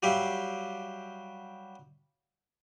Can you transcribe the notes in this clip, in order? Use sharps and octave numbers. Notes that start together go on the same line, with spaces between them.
F#3 G3 G4 E5 F5